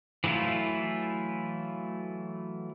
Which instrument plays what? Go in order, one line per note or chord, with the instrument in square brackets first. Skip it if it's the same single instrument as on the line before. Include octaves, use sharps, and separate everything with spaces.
[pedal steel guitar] E3 F#3 A3 E4 F4